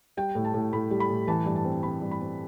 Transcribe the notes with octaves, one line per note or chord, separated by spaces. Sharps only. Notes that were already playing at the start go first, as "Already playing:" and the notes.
G3 G5
A2
A5
A2
A2 B5
G3
B5
A2
E3 A5
G2
A5
C4
C4 B5
G2
B5
C4